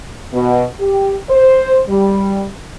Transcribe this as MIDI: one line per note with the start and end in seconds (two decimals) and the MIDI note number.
0.34 0.64 47
0.80 1.15 67
1.30 1.80 72
1.89 2.46 55